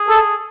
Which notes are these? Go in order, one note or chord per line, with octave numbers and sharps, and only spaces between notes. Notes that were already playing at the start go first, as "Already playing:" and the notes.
Already playing: G#4
A4